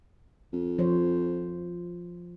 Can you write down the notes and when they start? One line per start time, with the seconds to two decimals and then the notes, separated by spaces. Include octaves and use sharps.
0.53 F2
0.79 F3 C5 C#5